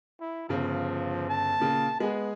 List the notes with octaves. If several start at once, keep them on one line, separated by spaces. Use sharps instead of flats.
E4
G1 C#3 F3
A5
A#2 C#3
G#3 B3 G#4